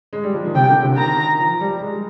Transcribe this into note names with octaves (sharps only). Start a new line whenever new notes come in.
G#3
G3
F3
D#3
C3 G5
D3
C3
D#3 A#5
F3
G3
G#3